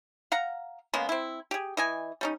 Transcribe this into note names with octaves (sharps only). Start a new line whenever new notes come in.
F5 F#5 A#5
C#3 G#3 A#3 B3
C4 E4
G4 G#4
E3 D#5 G#5
G3 C#4 D#4